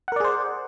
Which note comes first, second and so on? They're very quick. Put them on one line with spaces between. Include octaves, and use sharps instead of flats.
F#5 A#4 D5 G#4 C5